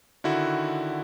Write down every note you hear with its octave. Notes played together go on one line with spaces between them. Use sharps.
D3 D#3 E4 F#4